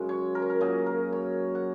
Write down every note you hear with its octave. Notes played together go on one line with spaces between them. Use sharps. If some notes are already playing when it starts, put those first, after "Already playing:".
Already playing: F#2 C#3 G#3
C#5
A#4
C#5
A#4
F#2 F#3 A#3 G#4
A#4
C#5
F#5